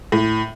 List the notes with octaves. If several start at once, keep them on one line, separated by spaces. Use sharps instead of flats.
A2